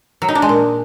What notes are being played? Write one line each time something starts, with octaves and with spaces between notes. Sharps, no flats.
F#3
D#4
D4
G#3
A#2